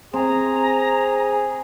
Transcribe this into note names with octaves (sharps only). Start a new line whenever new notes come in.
C4 G#4 A#5